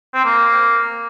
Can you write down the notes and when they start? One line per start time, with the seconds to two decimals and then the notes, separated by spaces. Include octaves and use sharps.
0.14 C4
0.25 A#3